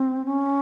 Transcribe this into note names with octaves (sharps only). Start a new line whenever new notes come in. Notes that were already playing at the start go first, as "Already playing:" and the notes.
Already playing: C4
C#4